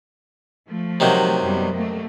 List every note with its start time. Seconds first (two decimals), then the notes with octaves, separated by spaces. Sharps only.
0.68 F3 A3
1.00 C3 D#3 F#3
1.41 F#2 G3 B3
1.76 A3 A#3